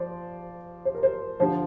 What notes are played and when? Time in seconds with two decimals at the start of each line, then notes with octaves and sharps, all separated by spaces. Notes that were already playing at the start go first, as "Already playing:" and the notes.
Already playing: F3 C5 D5
0.85 C5
0.95 A#4
1.03 C5
1.40 D3 F3 C5